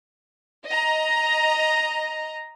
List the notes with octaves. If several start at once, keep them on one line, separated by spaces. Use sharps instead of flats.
D#5 A#5